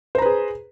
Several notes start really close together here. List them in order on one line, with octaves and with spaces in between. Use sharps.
C5 A#5 B4 G#4